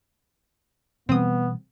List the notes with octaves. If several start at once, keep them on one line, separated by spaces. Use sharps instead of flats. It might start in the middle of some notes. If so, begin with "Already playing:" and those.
B2 E3 G3 B3 C4 D#6